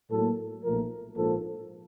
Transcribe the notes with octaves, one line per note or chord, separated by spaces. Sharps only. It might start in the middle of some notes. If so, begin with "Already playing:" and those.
A2 F#3 A#3 A4
B1 A#2 F3 A3 A#4
A#1 G#2 F3 A#3 A4